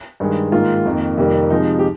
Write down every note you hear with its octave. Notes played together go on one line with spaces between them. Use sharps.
G2 D#3 G#3
G#2 D#3 A#3 F4
F2 D#3 A#3
F2 C3 D#3 G3 A#3
C3 F3 G#3 D#4
G4